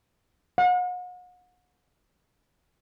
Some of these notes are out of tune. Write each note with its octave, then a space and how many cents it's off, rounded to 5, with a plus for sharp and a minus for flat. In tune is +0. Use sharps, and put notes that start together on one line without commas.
F#5 -40